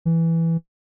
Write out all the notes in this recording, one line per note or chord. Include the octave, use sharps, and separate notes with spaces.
E3